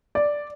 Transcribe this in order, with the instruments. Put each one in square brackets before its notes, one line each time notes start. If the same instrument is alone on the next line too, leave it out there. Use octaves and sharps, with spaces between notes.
[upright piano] D5